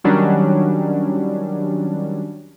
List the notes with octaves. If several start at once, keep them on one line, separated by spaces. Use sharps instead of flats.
D#3 F#3 G3 C#4 D4